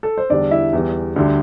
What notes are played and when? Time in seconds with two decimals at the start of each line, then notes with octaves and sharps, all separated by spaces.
0.03 A4
0.18 C5
0.30 E2 D3 G3 D4 D5
0.51 E4 E5
0.73 E2 E3 G3
1.16 D2 D3 G3